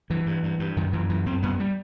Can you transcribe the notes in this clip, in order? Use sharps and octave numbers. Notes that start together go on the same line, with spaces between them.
G2 E3
G2
G2
G2
F#2 D#3
F#2 E3
F#2 E3
F#2 C4
F#2 B3
G3